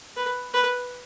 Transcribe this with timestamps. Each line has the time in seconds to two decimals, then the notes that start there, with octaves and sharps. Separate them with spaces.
0.17 B4
0.54 B4